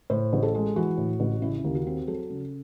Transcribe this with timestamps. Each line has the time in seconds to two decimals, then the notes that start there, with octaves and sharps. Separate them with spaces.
0.10 A2 C5
0.33 A1
0.43 A4
0.55 G#3
0.76 E3 F#4
0.98 A2
1.20 A1
1.42 C#3 E4
1.58 E4
1.64 D#2
1.75 F#4
1.87 C4
2.07 F#3 A4
2.30 C#3